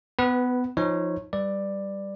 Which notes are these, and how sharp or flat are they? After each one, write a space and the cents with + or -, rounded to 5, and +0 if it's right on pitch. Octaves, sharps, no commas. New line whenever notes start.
B3 +20 B4 +0
F3 -5 D#4 +10 C#5 -10
G3 +0 B4 +0 D5 +10